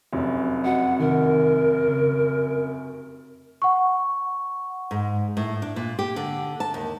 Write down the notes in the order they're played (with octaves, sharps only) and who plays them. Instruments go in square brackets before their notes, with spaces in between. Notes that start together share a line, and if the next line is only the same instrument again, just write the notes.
[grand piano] F1 F#2
[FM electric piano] F#4 D#5 [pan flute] F#5
[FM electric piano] C3 D#3 [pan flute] A#4
[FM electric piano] C#3
[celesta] F#5 C#6
[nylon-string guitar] G#2
A2
D4
A#2
G4
D3
A5
D#2